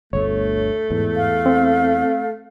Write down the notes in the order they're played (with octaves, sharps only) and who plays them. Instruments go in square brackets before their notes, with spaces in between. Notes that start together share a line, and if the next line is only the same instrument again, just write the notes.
[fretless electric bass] G1 D2 [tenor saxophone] A3 [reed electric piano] C#5
[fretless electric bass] E2 [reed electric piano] G#2
[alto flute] F5
[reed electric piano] C4